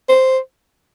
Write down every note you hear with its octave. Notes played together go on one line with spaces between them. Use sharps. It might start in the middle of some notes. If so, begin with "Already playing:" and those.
C5